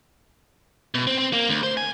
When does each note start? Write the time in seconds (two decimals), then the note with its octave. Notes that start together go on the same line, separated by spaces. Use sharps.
0.95 B2
1.07 C4
1.18 C4
1.33 A#3
1.49 D2
1.63 C5
1.77 G#5